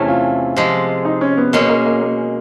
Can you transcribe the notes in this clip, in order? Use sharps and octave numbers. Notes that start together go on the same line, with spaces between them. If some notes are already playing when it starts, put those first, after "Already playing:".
Already playing: E2 C3 E3 A3 C#4
F4
C3 F3 G#3
D#4
C#4
B3
B2 G#3 A#3 C#4
A#3
A#3
A#3